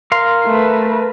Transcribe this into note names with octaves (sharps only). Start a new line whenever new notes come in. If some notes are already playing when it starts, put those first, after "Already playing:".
A#4 F5 C6
A3 B4